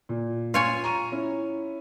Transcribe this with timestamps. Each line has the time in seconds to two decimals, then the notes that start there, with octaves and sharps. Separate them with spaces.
0.09 A#2
0.54 F4 C#5 G#5
0.84 A#5 C#6 D#7
1.12 C#4 E4